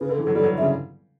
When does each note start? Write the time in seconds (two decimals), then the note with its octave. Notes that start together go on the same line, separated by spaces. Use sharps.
0.01 C#3 B4
0.09 D3
0.12 A4
0.18 E3
0.23 F#3 A4
0.35 G3 A4
0.43 F#3
0.52 D3
0.58 C#3 E5